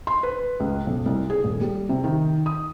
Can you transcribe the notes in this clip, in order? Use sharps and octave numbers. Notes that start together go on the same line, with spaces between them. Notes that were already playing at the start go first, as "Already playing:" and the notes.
C6
B4
C#2
B1
C2
G#4
D#1
G3
C3
D#3
D#6